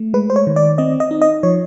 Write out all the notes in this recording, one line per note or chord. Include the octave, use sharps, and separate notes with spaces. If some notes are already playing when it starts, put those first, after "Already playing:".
Already playing: A3
G#3 B4
C5
C#5
D#3
D5
C4 D#5
D#5
D#4
D#5
F3 C#5